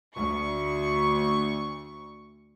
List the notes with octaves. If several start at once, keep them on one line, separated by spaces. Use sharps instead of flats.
D2 C#6